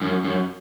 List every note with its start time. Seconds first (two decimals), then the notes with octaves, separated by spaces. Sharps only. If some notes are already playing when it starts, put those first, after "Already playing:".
0.02 F#2
0.24 F#2